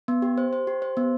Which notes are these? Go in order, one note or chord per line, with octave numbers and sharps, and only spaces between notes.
B3
G4
C5
C5
G4
C5
B3